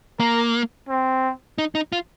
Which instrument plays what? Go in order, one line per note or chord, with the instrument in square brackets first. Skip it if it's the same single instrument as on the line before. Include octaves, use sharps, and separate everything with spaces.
[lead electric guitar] A#3 [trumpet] A#4
[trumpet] C4
[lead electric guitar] D#4
D#4
F4